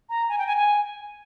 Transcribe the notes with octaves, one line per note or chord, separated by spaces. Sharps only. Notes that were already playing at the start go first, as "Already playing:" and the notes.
A#5
G#5
G5
G#5
G#5